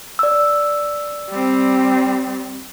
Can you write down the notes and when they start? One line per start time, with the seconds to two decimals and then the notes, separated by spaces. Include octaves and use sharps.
0.19 D5 E6
1.30 G3 C4